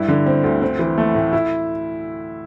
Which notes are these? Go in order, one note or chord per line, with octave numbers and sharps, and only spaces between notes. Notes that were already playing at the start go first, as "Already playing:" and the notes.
Already playing: G2 E4
D3
C4
D2
C4
E3
A3
A2
E4